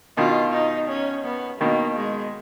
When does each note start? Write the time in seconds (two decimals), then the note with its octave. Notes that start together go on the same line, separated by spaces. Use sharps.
0.17 B2 D#3 F4
0.53 D#4
0.89 C#4
1.25 B3
1.60 B2 D#3 A#3
1.96 G#3